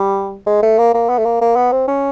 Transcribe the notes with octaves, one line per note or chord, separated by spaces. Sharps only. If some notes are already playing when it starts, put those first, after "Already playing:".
Already playing: G3
G#3
A3
A#3
A#3
B3
A3
A#3
A#3
B3
C4
C#4